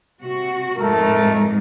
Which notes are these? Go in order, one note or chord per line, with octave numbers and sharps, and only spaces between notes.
C3 F#4
F2 G#2 G#3 A3 A4 A#4